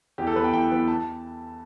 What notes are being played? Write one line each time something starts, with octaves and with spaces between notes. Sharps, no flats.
E2 G4
A4
E3 B3 B4 G5
E2 G5
E3 B3
A5